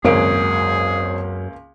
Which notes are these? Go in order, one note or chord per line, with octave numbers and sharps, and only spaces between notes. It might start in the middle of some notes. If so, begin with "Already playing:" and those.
G#1 C#2 F#2 A#3 G#4 C#5 D7